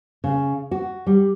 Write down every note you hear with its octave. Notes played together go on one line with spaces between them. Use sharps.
C#3
F#4
G3